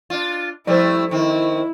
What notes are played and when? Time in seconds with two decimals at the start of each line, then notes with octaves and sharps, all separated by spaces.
0.10 D4 F4
0.67 F3 G3 A3 C4 E4 C5
1.11 D#3 C4 E4